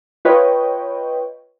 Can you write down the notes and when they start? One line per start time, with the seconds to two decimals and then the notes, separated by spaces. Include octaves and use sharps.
0.25 F4 B4 C#5 D#5 G5